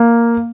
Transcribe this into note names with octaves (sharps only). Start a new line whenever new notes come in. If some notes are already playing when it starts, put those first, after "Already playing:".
Already playing: A#3